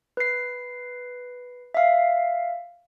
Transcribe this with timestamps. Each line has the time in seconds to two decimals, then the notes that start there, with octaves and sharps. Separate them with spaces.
0.17 B4 C7
1.74 E5 F5